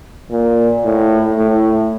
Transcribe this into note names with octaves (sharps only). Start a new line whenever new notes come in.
A#2
A2
A2